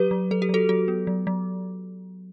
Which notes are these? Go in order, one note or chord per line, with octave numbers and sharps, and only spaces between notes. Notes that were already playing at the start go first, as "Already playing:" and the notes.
Already playing: F#3 G4 B4
F#3
F#3 A4
G4
F#3 F#4 A4
F#3 F#4
B3
F#3
F#3